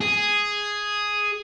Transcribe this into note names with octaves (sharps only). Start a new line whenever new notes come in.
G#4